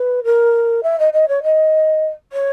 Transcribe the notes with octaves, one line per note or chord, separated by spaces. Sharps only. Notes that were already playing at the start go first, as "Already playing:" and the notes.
Already playing: B4
A#4
E5
D#5
D#5
C#5
D#5
C#5